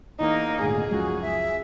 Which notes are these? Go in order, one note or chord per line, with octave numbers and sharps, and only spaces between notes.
E2 A#3 D#4
G#1 D2 A#2 G#4
C#2 F#2 F3 F#4
E5